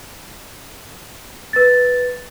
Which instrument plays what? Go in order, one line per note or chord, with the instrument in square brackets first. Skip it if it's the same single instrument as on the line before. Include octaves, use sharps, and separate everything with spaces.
[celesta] B4 A6